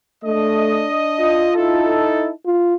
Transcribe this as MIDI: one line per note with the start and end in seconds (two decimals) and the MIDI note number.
0.24 0.87 57
0.24 1.50 62
0.24 1.50 75
1.20 2.04 65
1.55 2.30 63
1.55 2.30 64
1.55 2.30 69
2.45 2.74 65